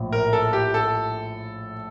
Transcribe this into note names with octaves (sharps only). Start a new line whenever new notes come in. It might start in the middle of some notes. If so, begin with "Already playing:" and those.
Already playing: A#1 A2
A#4
A4
G4
A4